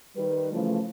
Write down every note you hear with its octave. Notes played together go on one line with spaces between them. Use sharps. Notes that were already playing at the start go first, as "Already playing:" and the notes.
D#3 G3 G4 B4
C#3 E3 F3 A3